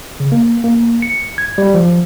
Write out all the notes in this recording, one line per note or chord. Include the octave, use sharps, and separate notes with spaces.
C#3
A#3
A#3
C#7
G#6
G3
F3